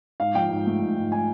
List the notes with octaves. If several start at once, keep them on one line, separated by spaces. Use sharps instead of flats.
G#2 F5
F3 G5
G#2
A3
G#2
G#2
G#5